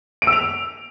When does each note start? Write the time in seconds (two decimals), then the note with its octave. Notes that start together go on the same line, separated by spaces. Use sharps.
0.22 D7
0.27 E6
0.32 F7